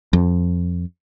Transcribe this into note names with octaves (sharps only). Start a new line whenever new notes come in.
F2